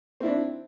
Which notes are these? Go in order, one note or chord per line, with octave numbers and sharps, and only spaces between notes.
C4 D4 E4